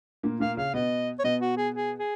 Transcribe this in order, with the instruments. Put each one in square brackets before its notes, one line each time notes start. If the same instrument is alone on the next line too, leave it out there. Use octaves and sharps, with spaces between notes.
[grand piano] A#2 A#3
[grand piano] A#2 A#3 [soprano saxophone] F5
[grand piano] C#3 C#4 [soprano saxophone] F5
[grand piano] B2 B3 [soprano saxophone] D#5
[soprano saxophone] C#5
[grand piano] B2 B3 [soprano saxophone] D#5
[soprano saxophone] F#4
G#4
G#4
G#4